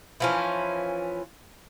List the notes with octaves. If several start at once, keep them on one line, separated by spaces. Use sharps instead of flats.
E3 F3 C#4